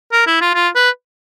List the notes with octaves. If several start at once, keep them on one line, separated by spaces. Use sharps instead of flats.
A#4
E4
F4
F4
B4